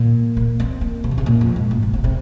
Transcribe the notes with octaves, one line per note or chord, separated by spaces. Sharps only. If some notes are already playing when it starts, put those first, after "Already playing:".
Already playing: A#2
A#3
C4
A#3
C3
D#3
C3
A#2
F2
G#2
A#2
C3
C3
C3